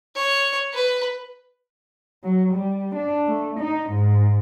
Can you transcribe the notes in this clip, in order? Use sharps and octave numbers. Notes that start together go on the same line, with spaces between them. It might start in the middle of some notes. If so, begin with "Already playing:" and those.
C#5
B4
F#3
G3
D4
A3
D#4
G#2